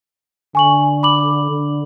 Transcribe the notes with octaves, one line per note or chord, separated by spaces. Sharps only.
D3 G#5 C#6 F#7
B5 D6 F#7
D3